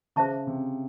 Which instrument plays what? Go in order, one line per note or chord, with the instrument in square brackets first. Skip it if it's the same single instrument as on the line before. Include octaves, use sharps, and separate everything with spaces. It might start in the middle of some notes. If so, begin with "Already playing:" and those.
[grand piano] C#3 [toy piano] G#4 C5 E5 A5 C#6
[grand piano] C3